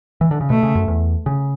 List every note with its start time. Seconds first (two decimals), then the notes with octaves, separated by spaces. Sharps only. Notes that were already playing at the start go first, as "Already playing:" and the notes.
0.21 E3
0.31 D3
0.41 C#3
0.50 B2 A3
0.63 C#3
0.75 F#2
0.88 E2
1.26 C#3